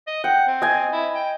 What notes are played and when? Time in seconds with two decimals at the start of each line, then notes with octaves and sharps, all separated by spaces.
0.07 D#5
0.24 F#5 G5
0.47 C4
0.62 D#5 G#5
0.92 E4
1.14 G5